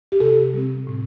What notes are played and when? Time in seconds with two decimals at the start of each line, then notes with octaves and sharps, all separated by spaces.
0.12 G4
0.20 C3 A4
0.54 G3 C4
0.87 A2